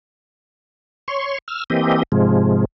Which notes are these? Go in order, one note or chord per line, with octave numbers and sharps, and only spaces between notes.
C#5 C6 C#6
E6 F6
E3 A#3 C4 G4 D#5
G#2 C3 F3 G#3